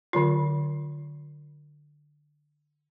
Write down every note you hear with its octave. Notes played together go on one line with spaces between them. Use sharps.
D3 F#3 F4